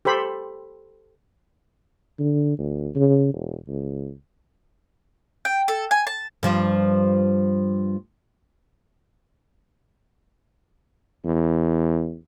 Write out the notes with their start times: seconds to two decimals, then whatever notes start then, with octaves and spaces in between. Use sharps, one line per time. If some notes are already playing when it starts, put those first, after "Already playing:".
0.05 G4 A4 C5 B5
2.19 D3
2.58 D2
2.95 C#3
3.33 E1
3.68 C#2
5.45 G5
5.68 A4
5.91 G#5
6.07 A5
6.43 G2 F3 G3
11.25 E2